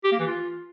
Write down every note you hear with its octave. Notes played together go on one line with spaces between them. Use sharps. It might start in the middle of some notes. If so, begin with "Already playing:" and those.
G4
A#3
E3
F4